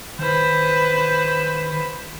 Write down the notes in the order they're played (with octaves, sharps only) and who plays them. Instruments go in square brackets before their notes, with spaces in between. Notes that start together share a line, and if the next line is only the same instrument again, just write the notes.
[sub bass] D#3 [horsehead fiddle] B4 C5